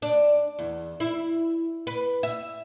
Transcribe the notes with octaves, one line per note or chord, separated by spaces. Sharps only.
D4
E2
E4
B4
E5